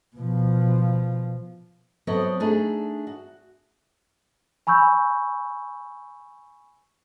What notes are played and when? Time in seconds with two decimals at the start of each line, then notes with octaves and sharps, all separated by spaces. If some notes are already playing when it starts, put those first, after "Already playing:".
0.16 B2 F3
2.07 F#3 B3 C4 A4 C#5 D#5
2.40 A3 D4 D#4 G#4
3.07 F#4
4.67 G#5 B5 C#6 E6 G6